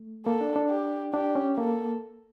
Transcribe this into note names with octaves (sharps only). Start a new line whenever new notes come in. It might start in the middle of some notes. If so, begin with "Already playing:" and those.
Already playing: A3
A#3 A4
D4
D4
G4
D4 G4
C#4
A#3 A4